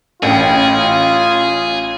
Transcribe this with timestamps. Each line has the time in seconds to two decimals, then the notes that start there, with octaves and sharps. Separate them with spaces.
0.23 A1 F4 G#4 G5